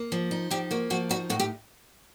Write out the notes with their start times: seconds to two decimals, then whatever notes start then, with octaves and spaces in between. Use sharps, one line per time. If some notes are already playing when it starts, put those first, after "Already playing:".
Already playing: A#3
0.12 F3
0.31 D#4
0.51 F3 G4
0.71 A#3 F#4
0.90 F3 F#4
1.09 D#4 F#4
1.30 A2 F#4
1.39 G4